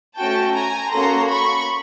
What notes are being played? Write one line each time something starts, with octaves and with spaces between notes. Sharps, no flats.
A3 C#4 F#4 G5 A5
G#5 A#5
A#3 C#4 F#4 A4 A#5 C6
B5 C#6